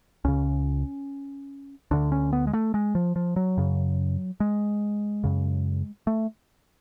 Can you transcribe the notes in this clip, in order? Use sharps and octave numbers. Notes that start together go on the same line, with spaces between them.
C#2 C#3 C#4
D2 D3 D4
C#4
B3
G#3
A3
G#3
F3
F3
F#3
F#2 C#3
G#3
F#2 C#3
A3